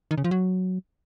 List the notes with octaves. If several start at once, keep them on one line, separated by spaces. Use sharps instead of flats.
D#3
C#3
F3
F#3